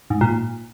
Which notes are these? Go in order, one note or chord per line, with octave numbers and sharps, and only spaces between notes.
G#2
A#2